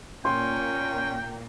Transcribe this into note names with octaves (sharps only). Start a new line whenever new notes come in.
A#2 A#3 C#4 G5 C6